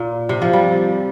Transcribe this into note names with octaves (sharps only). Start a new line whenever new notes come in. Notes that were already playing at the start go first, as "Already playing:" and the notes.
Already playing: A#2
C3
F3
G3